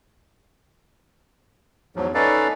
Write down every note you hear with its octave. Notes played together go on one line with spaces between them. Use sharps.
E2 G#2 F3 F#3
C#4 D#4 A4 B4 D5 F5